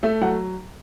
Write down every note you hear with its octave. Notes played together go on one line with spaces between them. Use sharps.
A3 E5
F#3 F#5